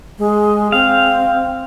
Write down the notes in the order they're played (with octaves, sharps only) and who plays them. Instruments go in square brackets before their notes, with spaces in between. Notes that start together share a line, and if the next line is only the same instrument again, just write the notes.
[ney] G#3
[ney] C4 [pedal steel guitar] F5